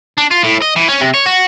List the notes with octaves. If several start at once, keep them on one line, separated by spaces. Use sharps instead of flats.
D4
F4
A2
D#5
E3
C#4
C3
C#5
F#4